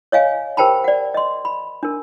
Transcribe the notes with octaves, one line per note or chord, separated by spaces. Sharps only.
C#5 D#5 F5 G#5
G4 A#4 C5 G5 A5 B5
D5 F#5
D#5 C6
B5
D4 A#4